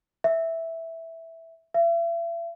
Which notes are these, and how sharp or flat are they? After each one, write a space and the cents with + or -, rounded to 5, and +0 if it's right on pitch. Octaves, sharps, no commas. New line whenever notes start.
E5 -5
E5 +40